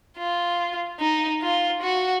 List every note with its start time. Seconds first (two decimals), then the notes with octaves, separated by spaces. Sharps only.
0.18 F4
1.00 D#4
1.42 F4
1.82 F#4